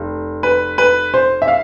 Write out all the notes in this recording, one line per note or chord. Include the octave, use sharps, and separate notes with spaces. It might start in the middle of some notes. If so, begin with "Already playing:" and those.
Already playing: F1
B4
B4
C5
E5
F5